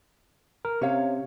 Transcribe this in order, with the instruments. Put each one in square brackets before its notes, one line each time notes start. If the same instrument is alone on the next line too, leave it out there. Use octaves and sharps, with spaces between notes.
[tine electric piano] A#4
[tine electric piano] C3 [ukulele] C#4 C#5 F5